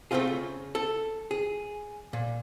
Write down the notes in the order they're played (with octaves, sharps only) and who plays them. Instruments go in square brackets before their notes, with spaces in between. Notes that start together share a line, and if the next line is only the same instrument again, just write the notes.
[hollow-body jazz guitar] A3 C4 C#4 D#4 F4 G#4
C#3
A4
G#4
A#2